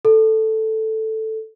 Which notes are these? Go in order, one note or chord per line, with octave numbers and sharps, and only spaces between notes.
A4